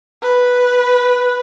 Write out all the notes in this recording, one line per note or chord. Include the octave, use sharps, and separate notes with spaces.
B4